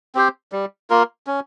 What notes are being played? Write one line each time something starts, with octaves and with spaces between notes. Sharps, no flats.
C4 G4 C5
G3
A#3 F4 A#4
C#4